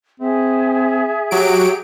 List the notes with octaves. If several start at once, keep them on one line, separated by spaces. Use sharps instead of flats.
C4 G#4 E5
F#3 G4 D7